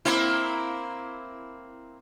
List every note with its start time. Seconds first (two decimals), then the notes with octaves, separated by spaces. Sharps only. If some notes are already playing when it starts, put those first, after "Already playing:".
0.05 A#3 C4 E4